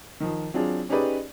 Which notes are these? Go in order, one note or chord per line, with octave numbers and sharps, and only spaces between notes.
D#3 F3
F#3 C4 D4 F4 G#4
C#4 D#4 G4 G#4 B4 D5